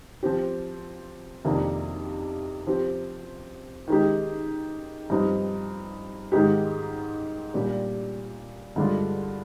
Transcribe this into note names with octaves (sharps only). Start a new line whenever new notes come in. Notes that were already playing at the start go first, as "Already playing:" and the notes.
F3 C4 G4
F2 C3 D#3 A#3 D4
F3 C4 G4
D#3 G#3 D#4 G4
G2 F3 C4 D#4 G4
G#2 D#3 G#3 D#4 G4
A#2 G3 D4 G4
G2 D3 G#3 D4 F4